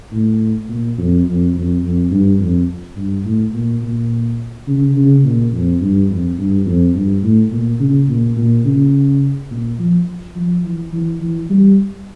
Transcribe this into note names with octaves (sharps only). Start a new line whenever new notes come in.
A2
A#2
F2
F2
F2
F2
G2
F2
G2
A2
A#2
A#2
C#3
C#3
A#2
F2
G2
F2
G2
F2
G2
A2
A#2
C#3
A#2
A#2
C#3
A#2
F3
F3
E3
E3
E3
G3